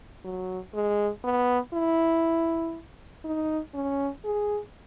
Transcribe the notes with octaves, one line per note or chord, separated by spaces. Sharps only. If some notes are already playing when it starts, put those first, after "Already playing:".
F#3
G#3
B3
E4
D#4
C#4
G#4